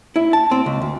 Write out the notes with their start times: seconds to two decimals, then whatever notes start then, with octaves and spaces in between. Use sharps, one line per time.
0.16 E4
0.33 A5
0.51 C4
0.66 C#2
0.82 D2